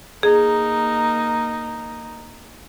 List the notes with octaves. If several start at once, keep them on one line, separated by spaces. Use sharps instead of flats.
A#3 D#4 G#4